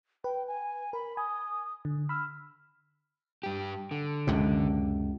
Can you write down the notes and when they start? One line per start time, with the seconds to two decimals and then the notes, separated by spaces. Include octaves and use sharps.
0.24 B4 G5
0.48 G#5
0.93 A#4 B5
1.17 G#5 D#6
1.85 D3
2.09 B5 E6 F6
3.43 G2 G4
3.91 D3
4.27 C#2 F#2 C3